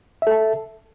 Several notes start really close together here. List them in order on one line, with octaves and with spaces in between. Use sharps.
E5 A4 A5